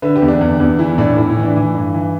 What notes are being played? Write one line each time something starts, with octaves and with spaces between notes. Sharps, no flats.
D3 B4 E5
G4 B4
E2
D4
E2
E2
E3 E4
A2 D4
A2 E4
E4
E3
D4
E3 E4
G2
E3